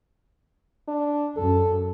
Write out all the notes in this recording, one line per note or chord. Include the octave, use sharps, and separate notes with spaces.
D4
F#2 A4